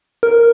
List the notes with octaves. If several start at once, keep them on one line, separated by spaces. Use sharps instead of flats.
A#4